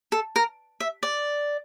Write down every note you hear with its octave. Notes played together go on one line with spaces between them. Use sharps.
A4
A#4
E5
D5